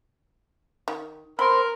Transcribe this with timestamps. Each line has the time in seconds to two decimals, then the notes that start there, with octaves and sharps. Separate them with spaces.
0.88 D#3
1.39 C4 A#4 C5 B5